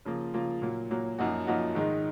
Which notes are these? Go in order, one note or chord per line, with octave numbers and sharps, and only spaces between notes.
C#3 F3 A#3 F4
C#3 F3 A#3 F4
A#2 F#3 A#3
A#2 F#3 A#3
F#2 F3 A#3 D#4 F#4
F#2 F3 A#3 D#4 F#4
G#2 D#3 G#3 D#4